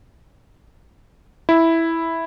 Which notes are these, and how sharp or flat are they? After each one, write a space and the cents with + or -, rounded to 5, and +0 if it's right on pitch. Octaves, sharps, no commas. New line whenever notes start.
E4 -5